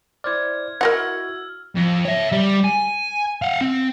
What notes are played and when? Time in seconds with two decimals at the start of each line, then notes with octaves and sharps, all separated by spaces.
0.24 E4 C5 D5 F6 G#6
0.81 E4 F#4 A#4 D#5 F#5 E6
1.76 F2
2.05 C#5 E5
2.32 G3
2.64 G#5
3.42 F5 F#5
3.61 C4